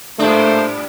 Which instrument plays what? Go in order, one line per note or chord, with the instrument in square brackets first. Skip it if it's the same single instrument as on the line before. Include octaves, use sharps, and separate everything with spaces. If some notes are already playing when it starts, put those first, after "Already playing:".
[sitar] G#2 G3 D4 [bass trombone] A3 [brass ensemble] A#3 A4 C5